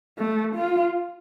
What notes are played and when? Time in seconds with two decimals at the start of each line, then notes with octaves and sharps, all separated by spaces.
0.18 A3
0.55 F4